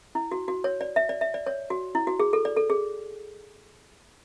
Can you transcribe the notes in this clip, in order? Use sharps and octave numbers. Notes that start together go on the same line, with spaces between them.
E4
F#4
F#4
C#5
D5
E5
D5
E5
D5
C#5
F#4
E4
F#4
G#4
A4
D5
A4
G#4